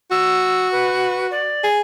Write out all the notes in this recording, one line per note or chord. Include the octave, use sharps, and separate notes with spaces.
F#4 E6
B4
D5
G#4